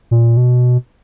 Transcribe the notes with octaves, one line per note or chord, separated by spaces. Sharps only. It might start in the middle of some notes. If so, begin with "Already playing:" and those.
A#2
B2